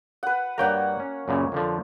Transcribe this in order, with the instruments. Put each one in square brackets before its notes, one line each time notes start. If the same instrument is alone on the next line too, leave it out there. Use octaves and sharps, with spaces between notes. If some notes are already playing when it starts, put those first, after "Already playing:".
[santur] B4 F#5
[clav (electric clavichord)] G2 G5 A#5 [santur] A#3 C#5 F#5
[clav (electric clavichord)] C#4
F#2 A#2 C#3
F2 D3 F3